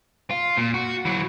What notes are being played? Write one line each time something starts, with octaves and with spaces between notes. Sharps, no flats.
F4
A#2
F#4
E3 F#3